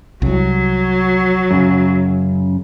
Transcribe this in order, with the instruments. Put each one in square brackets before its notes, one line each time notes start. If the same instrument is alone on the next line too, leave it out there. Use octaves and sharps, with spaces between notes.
[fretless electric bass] C2 [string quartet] F#3
[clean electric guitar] F#2 C#3